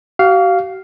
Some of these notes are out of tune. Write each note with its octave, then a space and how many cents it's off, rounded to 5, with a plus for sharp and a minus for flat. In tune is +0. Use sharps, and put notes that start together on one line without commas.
F#4 +45 F5 +0